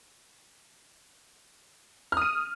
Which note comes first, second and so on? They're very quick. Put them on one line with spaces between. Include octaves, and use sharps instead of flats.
F6 D#6 D#7